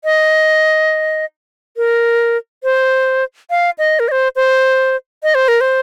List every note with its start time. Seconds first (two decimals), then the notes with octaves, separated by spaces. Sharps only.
0.04 D#5
1.77 A#4
2.64 C5
3.50 F5
3.78 D#5
4.00 A#4
4.08 D#5
4.12 C5
4.36 C5
5.23 D#5
5.35 C5
5.48 A#4
5.61 C5